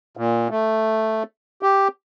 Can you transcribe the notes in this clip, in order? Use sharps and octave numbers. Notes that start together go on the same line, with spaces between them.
A#2
A3
G4